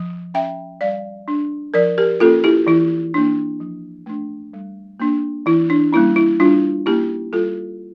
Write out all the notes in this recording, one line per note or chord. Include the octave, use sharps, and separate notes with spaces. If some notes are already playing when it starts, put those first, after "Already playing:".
Already playing: F3
C#4 E5 G5
G3 D5 F5
D4
F3 A#4 D5
G4 A#4
A#3 C#4 F4 A4
E4 G4
E3 E4
A#3 D4
F3
A3 D4
G3
A#3 D4
E3 E4
D4
G3 A#3 C#4 E4
E4
G3 D4 F4
A#3 C#4 E4 G4
G3 F4 A4